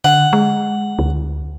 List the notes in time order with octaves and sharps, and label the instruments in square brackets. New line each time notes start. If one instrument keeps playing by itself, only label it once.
[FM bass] D3 [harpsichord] F#5
[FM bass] G#3
D2